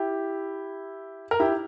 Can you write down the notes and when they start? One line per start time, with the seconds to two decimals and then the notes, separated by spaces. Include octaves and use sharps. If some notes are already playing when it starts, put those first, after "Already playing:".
Already playing: E4 G4
1.31 A#4
1.40 E4 G4